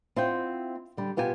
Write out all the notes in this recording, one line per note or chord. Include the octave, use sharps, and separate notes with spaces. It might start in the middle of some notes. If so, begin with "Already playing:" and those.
C4 E4 F4 D#5 F#5 G5
D3 G3
B2 B3 F4 G4 A#4 G#5